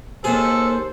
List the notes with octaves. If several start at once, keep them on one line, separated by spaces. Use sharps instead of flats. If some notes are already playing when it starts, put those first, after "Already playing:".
D#2 G#4 A4 C5